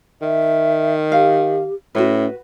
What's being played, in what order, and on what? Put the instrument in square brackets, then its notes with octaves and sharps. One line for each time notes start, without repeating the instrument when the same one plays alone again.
[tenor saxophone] D#3 [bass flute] E5
[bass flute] G4 [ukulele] F5
[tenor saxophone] A2 [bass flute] C#4 [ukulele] F#4 B4